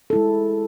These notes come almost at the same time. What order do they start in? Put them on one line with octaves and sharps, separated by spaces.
A4 E4 G#3